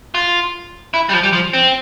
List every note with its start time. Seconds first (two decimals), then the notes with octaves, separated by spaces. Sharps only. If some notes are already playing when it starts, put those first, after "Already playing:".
0.15 F4
0.94 E4
1.09 G3
1.13 F3
1.23 G3
1.33 F3
1.54 C4